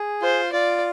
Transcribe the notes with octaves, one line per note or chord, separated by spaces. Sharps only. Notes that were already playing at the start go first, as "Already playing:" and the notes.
Already playing: G#4
F4 C5
F4 D5